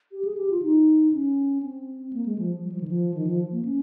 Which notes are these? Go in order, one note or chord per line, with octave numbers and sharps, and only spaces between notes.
G4
G#4
G4
F4
D#4
C#4
C4
A#3
G#3
F3
G3
F3
D#3
F3
D#3
F3
A#3
C#4